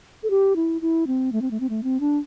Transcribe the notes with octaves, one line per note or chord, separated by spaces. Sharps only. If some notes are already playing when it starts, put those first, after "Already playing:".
A4
G4
E4
E4
C4
A3
C4
A3
C4
A3
C4
D4